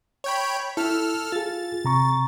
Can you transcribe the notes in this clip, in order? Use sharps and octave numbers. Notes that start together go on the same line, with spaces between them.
C#5 G5 B5
E4 A4 F6
F4 G#4 A6
C3 A#5 C#6